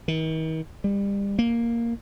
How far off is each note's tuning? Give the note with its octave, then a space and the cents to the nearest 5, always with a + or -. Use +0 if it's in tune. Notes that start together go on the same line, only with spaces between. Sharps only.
D#3 +45
G3 +30
A#3 +0